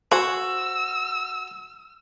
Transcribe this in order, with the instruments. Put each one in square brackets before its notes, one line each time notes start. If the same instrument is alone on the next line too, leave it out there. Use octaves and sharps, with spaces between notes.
[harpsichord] F#4 [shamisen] C5 G#5 [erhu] E6